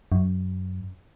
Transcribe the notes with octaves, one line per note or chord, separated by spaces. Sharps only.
F#2